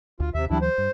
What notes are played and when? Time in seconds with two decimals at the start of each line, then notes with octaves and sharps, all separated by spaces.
0.20 D2 F4
0.34 D#2 C3 E5
0.50 D2 E3 F#3 G3 D4 E4
0.62 C5
0.78 G2